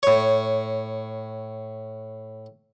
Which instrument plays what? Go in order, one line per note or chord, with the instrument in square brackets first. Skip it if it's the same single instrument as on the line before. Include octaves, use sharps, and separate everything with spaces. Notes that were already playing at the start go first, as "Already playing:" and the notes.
[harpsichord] A2 C#5